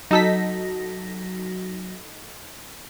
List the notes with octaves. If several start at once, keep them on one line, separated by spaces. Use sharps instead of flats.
F#3 D#4 F#4 A4 A#6 B6